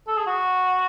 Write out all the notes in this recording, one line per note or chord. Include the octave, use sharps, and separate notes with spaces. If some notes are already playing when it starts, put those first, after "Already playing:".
A4
G#4
F#4